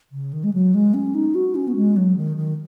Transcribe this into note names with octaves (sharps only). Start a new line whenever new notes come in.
C#3
D#3
G#3
F#3
G#3
C#4
D#4
F#4
C#4
B3
G#3
F#3
D#3
D#3